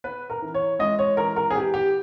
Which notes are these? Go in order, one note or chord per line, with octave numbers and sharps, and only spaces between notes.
B3 B4
A#4
E3
C#5
G#3 D#5
C#5
E3 A#4
A#4
G#4
B3 G4
G4